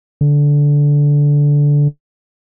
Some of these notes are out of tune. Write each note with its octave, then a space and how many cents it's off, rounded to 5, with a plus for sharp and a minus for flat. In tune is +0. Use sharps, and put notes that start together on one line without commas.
D3 -15